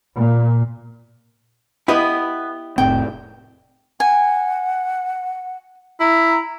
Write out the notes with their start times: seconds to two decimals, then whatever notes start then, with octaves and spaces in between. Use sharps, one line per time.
0.16 A#2
1.88 B3 E4 G4 D#5
2.78 F1 A2 C4 G5
4.00 F#5 G#5
6.00 E4 A#5